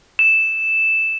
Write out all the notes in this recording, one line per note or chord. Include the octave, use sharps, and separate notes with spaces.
E7